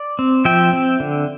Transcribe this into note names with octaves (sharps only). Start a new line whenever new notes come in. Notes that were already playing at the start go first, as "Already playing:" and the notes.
Already playing: D5
C4
F3 E5 G5
C4
D3